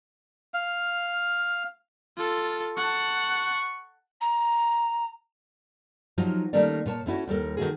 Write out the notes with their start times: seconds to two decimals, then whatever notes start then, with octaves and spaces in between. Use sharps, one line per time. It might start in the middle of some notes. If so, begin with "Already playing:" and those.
0.54 F5
2.17 F4 A4
2.77 F#5 A5 C#6
4.21 A#5
6.18 F3 F#3 D#4 F4 G4
6.53 D#3 G3 A3 A#3 C#4 D5
6.86 A#2 C#5 A5
7.06 A3 C#4 E4 F#4
7.28 D#2 G3 A4 A#4
7.57 D#3 A3 F#4 G#4